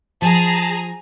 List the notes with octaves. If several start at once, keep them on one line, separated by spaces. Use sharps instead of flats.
F3 G#4 A5 A#5